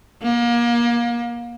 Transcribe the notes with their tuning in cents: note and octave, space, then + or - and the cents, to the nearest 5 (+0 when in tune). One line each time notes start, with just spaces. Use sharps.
A#3 +30